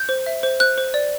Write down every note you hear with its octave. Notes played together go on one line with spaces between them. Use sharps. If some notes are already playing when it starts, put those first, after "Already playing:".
Already playing: G6
C5
E5
C5
C5 F#6
C5
D5